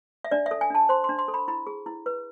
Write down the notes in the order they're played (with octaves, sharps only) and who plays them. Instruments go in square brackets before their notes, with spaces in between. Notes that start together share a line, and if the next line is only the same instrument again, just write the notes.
[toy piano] E5
D4 D5
E5
A4
G#5
D4 A5
C5 C6
C6
D4
C6
A4
B5
E4 B5
G#4
E4
B4